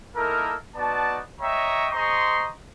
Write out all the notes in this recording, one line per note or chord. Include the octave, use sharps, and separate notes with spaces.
A#3 D#4 E4 A4 A#4
B3 D#4 F#4 D5 A5
C#5 D#5 E5 G5 A#5 C#6
G#4 C5 D#5 A#5 C6 C#6